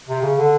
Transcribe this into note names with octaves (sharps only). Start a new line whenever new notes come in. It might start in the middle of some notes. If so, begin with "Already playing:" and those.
C3
C#3
D3